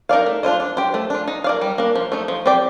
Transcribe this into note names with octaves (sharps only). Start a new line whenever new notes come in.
D#4 A#4 D5 F5
A3
D4 F4 C5 D#5
D4
G4 C5
A3
D4 F4
D#4
A#4 D5 F5
G3
A#3 D4
F3
A3 D#4
F3
C4 G4 D5